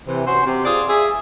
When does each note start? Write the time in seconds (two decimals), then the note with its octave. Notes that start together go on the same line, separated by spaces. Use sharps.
0.07 C3 E3
0.26 C#4 F#4 C5
0.46 C3
0.65 F4 G#4 C5 D5
0.89 G#4 E5